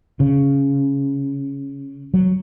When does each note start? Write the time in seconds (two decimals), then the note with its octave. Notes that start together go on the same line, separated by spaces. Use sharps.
0.20 C#3
2.14 F#3